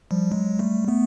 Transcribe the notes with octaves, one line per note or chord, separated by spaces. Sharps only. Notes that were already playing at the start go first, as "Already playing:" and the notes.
F3 G3
F#3 G#3
G3 A3
A3 B3